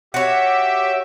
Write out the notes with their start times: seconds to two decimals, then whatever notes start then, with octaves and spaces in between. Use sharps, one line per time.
0.14 F#4 G4 C#5 E5